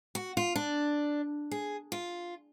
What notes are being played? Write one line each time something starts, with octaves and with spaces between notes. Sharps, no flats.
F#4
F4
D4
G#4
F4